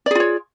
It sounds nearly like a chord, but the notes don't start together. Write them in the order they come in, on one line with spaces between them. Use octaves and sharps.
D5 G#4 F4 C#5